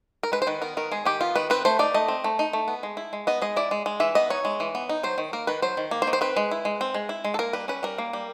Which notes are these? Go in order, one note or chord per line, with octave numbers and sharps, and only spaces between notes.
A#4
G#3 B4
C5
D#3 B4
B3 A#4
D#3 A#4
G#3 G#4
D#3 G4
B3 F4
D#3 B4
C4 B4
A3 C5
D#4 D5
A3 D#5
C4
A3
D#4
A3
B3
G#3
E4
G#3
B3 D#5
G#3 D#5
E4 D5
G#3
G#3
E3 E5
B3 D#5
D#4 C#5
G#3
E3
B3
D#4
F#3 C5
D#3
A#3 A#4
D#3 B4
F#3 C5
D#3
A#3
C5
D#3
C5
C4 B4
G#3
E4
G#3
C4
G#3
E4
G#3
A4
A#3 A#4
G3 B4
C#4 B4
G3 A#4
A#3
G3